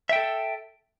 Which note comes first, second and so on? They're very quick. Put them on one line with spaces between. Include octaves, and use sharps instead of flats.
E5 G5 A4